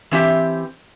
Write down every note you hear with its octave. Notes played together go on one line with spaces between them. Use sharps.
E3 C4 G4 E5